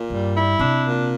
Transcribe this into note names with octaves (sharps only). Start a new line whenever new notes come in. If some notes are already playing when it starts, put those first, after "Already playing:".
Already playing: A#2
G2 G3
E4
C3 D4
A#2